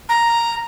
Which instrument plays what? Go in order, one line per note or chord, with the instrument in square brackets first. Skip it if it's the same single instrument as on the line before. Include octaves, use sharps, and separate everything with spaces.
[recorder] A#5